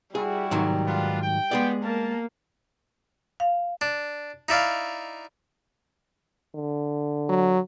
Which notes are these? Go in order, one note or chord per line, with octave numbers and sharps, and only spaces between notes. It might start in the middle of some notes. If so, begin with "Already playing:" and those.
G3 E4 F#4 G#4
G#2 D#3 F#3
B3 D4 F4
G5
G#3 B3 G#4 D5
A#3 A#4 A5
F5
D4
D#4 E4 D5 F5
D3
F#3